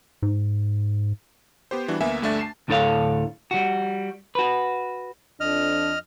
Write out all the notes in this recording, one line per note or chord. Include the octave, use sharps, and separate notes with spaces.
G#2
B3 G4 C5
E3 G3 D4 F#4
D2 A#3 B3 E5 G#5
D2 G2 A3 D4 E5 A6
A5 C7 E7
D2 A2 D4 A4 C#5 F5
G3 F#4
F#4 B4
F2 D4 D#5 F6